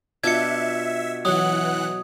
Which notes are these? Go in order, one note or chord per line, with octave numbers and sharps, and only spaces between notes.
B2 D4 F4 E5 G#6 C#7
E3 F#3 F#5 D#6 F#6